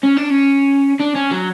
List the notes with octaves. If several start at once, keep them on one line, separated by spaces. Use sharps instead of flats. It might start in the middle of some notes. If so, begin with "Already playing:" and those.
C#4
D4
C#4
D4
C#4
F#3